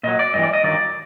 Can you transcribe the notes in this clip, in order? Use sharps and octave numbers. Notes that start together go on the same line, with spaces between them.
A#2 F#3 D#5
D5
G2 E3 D#5
D5
D#5
G2 D#3 F#3 D5